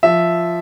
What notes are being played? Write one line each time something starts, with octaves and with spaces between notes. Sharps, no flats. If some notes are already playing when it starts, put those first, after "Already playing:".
F3 E5